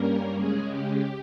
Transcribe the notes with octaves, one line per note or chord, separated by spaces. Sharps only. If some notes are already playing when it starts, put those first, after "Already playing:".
Already playing: G2 G3 A#3 C#4 A#4
C#3 G#3 C#4 G#4
G4